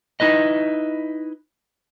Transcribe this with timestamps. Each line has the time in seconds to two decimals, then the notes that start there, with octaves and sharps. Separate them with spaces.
0.20 D#4 E4 B4 D#5